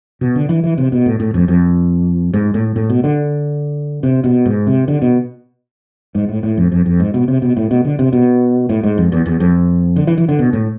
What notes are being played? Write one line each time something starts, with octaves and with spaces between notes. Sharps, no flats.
B2
D3
E3
E3
C3
B2
A2
A2
F2
F2
G#2
A2
A2
B2
D3
C3
B2
G#2
C3
D3
B2
G#2
A2
A2
F2
F2
F2
G#2
B2
C3
B2
A2
B2
D3
C3
B2
A2
G#2
F2
E2
E2
F2
D3
E3
E3
D3
B2
A2